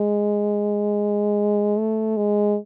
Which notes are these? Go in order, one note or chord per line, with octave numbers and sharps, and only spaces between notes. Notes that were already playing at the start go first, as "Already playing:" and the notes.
Already playing: G#3
A3
G#3